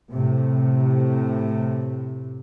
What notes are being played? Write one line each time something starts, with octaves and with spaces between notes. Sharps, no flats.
A2 C3